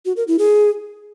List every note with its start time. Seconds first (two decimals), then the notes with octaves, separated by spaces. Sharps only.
0.06 F#4
0.17 A#4
0.28 E4
0.39 G#4